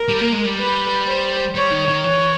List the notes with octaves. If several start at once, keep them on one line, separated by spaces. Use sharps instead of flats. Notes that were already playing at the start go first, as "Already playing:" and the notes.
Already playing: A#4
G3
A#3
G#3
G3
B4
C5
G3 C#5
D#3
D#3
E3 C#5